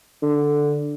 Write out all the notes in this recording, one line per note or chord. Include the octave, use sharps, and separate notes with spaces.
D3